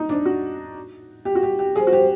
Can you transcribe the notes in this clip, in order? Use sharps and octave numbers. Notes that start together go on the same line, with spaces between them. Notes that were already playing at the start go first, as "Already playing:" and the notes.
Already playing: D#4
D#3 F3 D4
F#4
G4
F#4
G4
G4
F3 G3 G#4
F#4
G4